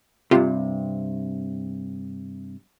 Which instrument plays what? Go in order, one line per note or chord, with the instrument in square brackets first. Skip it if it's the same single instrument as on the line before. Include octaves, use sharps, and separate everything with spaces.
[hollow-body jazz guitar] G2 C3 [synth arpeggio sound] F4 G4